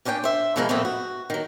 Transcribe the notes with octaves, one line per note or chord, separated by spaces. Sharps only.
A#2 C#4 D4 C5 G5
C5 E5
B2 E3 F3 G#3 A#4
F2 A#2 E3 A3 B3 C4
F#4
D#3 F#3